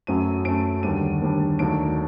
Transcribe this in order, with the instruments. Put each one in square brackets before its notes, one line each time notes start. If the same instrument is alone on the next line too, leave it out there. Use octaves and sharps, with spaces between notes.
[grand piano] F#2 F#3 A3 D#7
F#2 F#3 A3 D7
D#2 D3 G3 D4 D#7
D#2 D3 G3 D4
D#2 D#3 F#3 A3 D4 D7